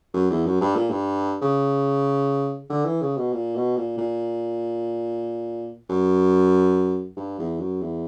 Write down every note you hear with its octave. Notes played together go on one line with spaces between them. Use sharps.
F#2
E2
F#2
G2
A#2
G2
C#3
D3
E3
C#3
B2
A#2
B2
A#2
A#2
F#2
G2
E2
F#2
E2